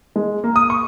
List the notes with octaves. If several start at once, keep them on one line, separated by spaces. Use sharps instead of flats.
G#3
A#3
D#6
C#6